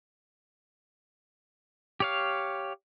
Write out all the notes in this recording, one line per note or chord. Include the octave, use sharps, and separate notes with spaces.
G4 C#5 F5